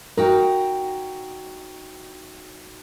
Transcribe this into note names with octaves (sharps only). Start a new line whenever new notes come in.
D#4 F#4 A#4 G5